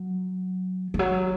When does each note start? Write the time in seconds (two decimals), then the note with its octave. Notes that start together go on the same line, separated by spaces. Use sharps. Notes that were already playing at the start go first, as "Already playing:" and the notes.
Already playing: F#3
0.94 E3
0.99 F#3